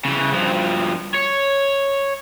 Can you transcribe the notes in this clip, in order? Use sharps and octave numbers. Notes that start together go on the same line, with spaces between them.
C#3 E3
G2 F3
C#5